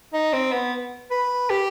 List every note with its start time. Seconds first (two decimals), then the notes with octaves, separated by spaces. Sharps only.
0.13 D#4
0.33 C4
0.52 B3
1.11 B4
1.50 G4